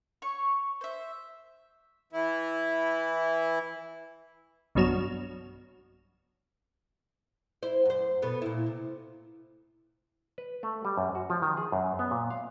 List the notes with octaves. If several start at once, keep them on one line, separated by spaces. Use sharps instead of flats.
C#5 C#6
C5 E5
E3 E4
B1 G2 B2 F#3 F6 E7
E4 C5
F#2 C5
B2 B3 A4
A#2 E4
C3
B4
A3
G3
F#2
F#4
F3
D#3
G#4
F#2
B3
A#2
F5